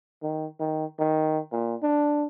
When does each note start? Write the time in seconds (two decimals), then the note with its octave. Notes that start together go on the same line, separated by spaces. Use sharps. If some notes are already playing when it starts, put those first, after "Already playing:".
0.23 D#3
0.60 D#3
0.99 D#3
1.52 A#2
1.82 D4